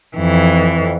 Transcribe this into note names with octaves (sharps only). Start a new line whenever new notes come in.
F2 E3